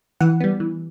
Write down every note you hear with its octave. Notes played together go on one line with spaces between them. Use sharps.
E3 F#5
G3 B3
E3